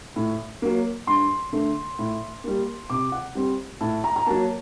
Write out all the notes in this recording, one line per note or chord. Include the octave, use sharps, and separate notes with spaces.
A2
F#3 A#3
G2 C6
D3 A3
A2
G3 A#3
C3 D6
F#5
G3 C4
A2 A5
A#5
A#5
F#3 A#3 A5